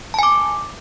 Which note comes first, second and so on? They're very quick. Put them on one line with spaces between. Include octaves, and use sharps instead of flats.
A5 G#5 D6